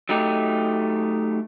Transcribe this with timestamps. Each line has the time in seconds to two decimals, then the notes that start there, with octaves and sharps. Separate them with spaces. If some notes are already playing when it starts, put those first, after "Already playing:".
0.09 F#3 A3 D#4 G4